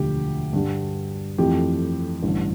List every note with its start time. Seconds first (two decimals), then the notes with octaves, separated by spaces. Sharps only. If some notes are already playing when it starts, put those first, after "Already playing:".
Already playing: E1 D2 D3 F3 G4
0.53 G2 D3 G3
1.38 F2 E3 A3 C4 G4
2.23 A1 G2 D3